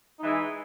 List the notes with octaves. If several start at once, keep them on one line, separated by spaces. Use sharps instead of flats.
E3 G#3 D#4